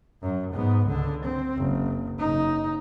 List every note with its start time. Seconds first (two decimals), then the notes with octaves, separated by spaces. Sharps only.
0.22 F#2
0.54 G#2 B3
0.87 C#2 D3
1.25 C4
1.58 F#1
2.19 F#1 D#4